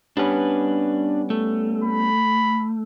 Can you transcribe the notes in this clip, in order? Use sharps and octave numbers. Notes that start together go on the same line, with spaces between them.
G3 B3 C#4 D4 B4
A3
B5